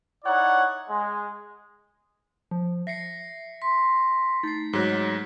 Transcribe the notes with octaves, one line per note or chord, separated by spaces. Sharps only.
D#4 E4 C#5 D5 F#5
G#3
F3
E5 A#6 C7 C#7
C6 B6
A3 D#4 A6 C7
G#2 F#3 F#6 B6